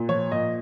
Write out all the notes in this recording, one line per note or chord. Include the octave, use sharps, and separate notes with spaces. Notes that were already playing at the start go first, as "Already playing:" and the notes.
Already playing: A#2
F3 C#5
A#2 D#5